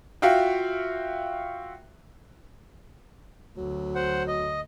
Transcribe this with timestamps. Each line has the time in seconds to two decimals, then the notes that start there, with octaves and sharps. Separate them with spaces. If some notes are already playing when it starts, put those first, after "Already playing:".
0.22 F4 F#4 E5 F5 G5
3.57 D2 F#3
3.95 C5 F#5
4.28 D#5